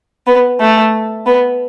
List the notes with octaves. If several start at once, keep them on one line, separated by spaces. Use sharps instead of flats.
B3
A3
B3